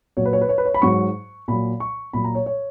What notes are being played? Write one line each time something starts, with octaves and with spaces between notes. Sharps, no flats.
A#2 F#3 C#5
B4
C#5
B4
C#5
B4
C#5
B5
G#2 F#3 C#6
A#2 F#3 B5
C#6
A#2 F#3 B5
A#5
C#5
C#5